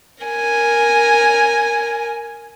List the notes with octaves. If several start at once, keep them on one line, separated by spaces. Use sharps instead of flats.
A#4 G#5